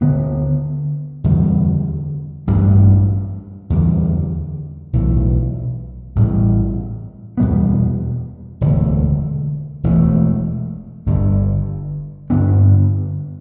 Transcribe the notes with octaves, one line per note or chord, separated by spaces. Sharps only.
D2 D3 B3 D4
E2 D3 G3
A1 G2 G3 D4
E2 D3 G3
B1 A2 E3
A1 A2 G3
E2 B2 G3 B3
E1 D2 D3 A3
E1 E2 B2 A3
G1 G2 D3
G2 D3 B3 D4